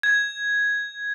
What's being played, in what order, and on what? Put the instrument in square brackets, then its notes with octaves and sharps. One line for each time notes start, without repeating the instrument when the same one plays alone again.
[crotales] G#6